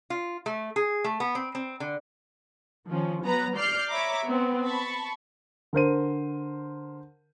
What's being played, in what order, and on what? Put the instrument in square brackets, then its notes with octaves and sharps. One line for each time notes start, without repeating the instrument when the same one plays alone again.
[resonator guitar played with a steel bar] F4
A3
G#4
A3
B3
C4
C4
D3
[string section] D#3 F3 C#4
F#3 B3 B4 A#5
D5 F6 G6 C7
C#5 E5 A#5 B5 D6
B3 C4
A5 B5 C#6
[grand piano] D3 A#4 C5 D#7